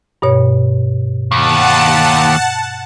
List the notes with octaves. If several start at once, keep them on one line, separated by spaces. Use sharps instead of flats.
G2 B2 C#5
D#2 F#5 A5